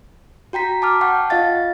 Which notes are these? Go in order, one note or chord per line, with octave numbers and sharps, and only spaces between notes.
F#4 G5 A#5 B6
A5 D6 F6
F#5 G5 A5 C#6
F4 D#5 F5 A6